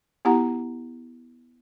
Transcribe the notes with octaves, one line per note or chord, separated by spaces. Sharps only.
B3 E4 G4 F#5 A#5